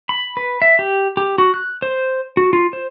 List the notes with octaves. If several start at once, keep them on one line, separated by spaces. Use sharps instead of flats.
B5
B4
E5
G4
G4
F#4
F#6
C5
F#4
F4
C5